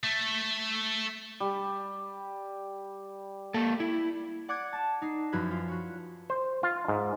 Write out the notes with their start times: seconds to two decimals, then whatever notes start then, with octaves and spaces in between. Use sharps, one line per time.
0.04 A3
1.40 G3
3.54 A#3 A4 A5
3.80 E4
4.48 D5 F#5 D6 F#6 G#6
4.73 A5
5.02 D#4 C7
5.32 F#2 F3 E4 F#4 B4 G#6
5.51 F4
5.68 F#4 C#5
6.30 C5
6.63 F4
6.88 G#2